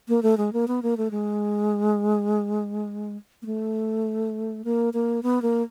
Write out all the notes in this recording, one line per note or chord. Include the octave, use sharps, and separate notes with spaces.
A#3
A3
G#3
A#3
B3
A#3
A3
G#3
A#3
A3
A#3
A#3
B3
A#3